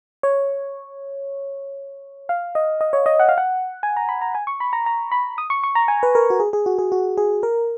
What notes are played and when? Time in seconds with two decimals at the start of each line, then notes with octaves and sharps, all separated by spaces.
0.23 C#5
2.29 F5
2.55 D#5
2.81 D#5
2.93 C#5
3.06 D#5
3.20 F#5
3.29 F5
3.38 F#5
3.83 G#5
3.97 A#5
4.09 B5
4.21 A#5
4.35 G#5
4.47 C#6
4.60 B5
4.73 A#5
4.86 A#5
5.12 B5
5.38 D#6
5.50 C#6
5.64 C#6
5.75 A#5
5.88 G#5
6.03 B4
6.15 A#4
6.30 F#4
6.40 G#4
6.53 G#4
6.66 F#4
6.79 G#4
6.92 F#4
7.17 G#4
7.43 A#4